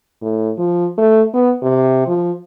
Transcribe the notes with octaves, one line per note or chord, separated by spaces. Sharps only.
A2
F3
A3
B3
C3
F3